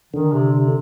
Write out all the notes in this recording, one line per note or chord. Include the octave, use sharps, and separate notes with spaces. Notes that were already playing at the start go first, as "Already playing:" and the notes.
D3 D#3
C3
C3